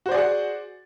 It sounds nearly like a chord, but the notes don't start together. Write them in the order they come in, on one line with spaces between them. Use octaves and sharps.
F#4 C5 D5 G#4 F#5